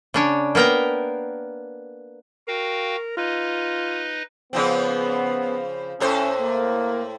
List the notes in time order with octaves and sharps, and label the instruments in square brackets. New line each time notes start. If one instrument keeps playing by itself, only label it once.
[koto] C#3 D4 C#5
A#3 B3 A#4 G5 A#5
[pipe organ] F#4 F5 G5 [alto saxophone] A#4
[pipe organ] D#4 B4 D#5 [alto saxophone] F4
[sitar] C#3 F3 C4 [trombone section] B3
[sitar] A2 A4 C5 [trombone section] C#4
[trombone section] A#3